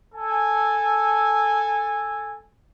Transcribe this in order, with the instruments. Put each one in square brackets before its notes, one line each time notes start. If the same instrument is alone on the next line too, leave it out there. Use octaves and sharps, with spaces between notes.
[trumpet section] A4 G#5